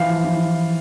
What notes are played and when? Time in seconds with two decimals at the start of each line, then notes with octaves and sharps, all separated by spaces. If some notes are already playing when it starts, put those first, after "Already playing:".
Already playing: E3 F3 F5
0.24 E3